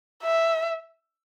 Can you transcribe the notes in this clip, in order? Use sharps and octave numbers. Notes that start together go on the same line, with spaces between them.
E5